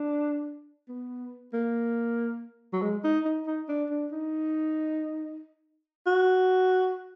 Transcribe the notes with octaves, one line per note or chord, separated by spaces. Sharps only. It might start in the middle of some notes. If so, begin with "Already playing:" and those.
Already playing: D4
B3
A#3
F#3
G#3
D#4
D#4
D#4
D4
D4
D#4
F#4